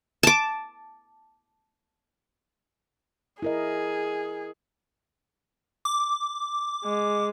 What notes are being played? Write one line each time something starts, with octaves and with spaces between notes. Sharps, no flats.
A5 D6
E4 G#4 A#4 D#5
D6
G#3